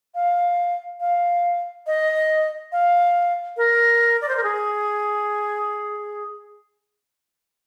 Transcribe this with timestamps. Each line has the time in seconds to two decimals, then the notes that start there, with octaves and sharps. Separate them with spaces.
0.15 F5
1.00 F5
1.87 D#5
2.72 F5
3.57 A#4
4.22 D5
4.29 C5
4.37 A#4
4.43 G#4